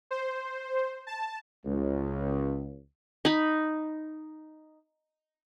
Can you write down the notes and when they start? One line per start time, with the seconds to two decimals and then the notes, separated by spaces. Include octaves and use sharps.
0.11 C5
1.07 A5
1.65 C#2
3.25 D#4 B5